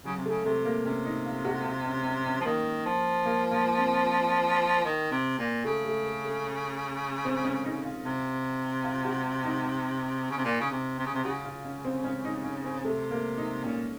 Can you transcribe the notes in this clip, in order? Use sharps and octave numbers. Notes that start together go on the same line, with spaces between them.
C#3 F#3
C3
A3
C#3
C3 A3
A#3
C3 C#4
D#4
F4
F#4
F4
C#4
C#4
C#4
F3
D#3 A#3
F3
A#3
A#3
C4
D#3
C3
A#2
C#3 A3
A3
A3
A3
C4
C#4
D#4
F4
C3
F4
F#4
D#4
C#3
C3
A#2
C#3
C3
C3
C#3
C3
C#3 F#4
F4
C#4
C4
C#4
D#4
C#4
C4
C3 A3
A#3
D#4
A#2 C#4